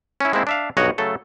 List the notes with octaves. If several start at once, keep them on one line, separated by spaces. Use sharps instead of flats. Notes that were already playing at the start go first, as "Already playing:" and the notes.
C#4 E4
G#3 A#3 C4 E4
D4 E5 F5
B1 G2 F#4 C#5 D#5 F#5
C#3 F#3 A3 A4